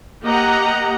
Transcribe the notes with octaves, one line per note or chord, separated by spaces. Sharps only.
A#3 G4 D#5 F#5 A#5